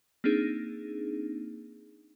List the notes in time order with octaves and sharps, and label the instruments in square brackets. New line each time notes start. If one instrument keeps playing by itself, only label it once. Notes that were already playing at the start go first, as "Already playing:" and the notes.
[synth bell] A#3 C4 D4 D#4 G#4